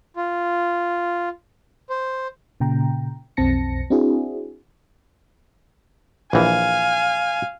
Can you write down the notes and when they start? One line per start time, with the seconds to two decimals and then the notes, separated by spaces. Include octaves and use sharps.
0.16 F4
1.90 C5
2.60 A#2 C#3 G5 A#5
3.37 B1 F2 C4 A5 A#6 C#7
3.90 C4 D4 E4 F#4 G#4
6.33 A#1 E3 F5 G#5